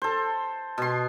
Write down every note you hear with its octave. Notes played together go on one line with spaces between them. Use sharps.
A4 C5
B2 C6